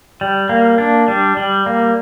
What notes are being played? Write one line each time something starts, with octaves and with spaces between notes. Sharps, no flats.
G3
A#3
D4
G3
G3
A#3